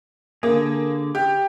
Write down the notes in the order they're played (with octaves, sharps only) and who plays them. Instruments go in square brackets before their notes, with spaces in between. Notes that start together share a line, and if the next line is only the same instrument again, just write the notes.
[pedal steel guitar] D3 G#4 [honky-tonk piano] A#3
[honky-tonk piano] G4